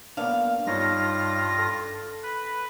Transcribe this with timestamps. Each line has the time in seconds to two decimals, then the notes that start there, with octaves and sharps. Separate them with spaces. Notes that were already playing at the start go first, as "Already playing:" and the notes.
0.17 A#3 B3 D4 F5
0.66 G2 G3 D#4 F4 C#5 A#6
1.58 A4
2.23 B4